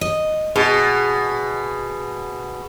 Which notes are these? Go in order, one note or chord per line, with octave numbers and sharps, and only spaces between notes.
D#5
B2 G#4